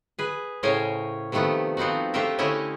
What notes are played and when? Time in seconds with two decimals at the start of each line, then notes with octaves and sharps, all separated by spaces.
0.19 G#4 B4
0.63 A2 C#3 C#4 A#4 C5 G#5
1.32 C3 D#3 F3 A3 B3
1.77 F3 B3 C4 D#4 F#4
2.14 A3 D4 F4 G4 A#4 E5
2.38 D3 A3 C#4 E4 D#5 E5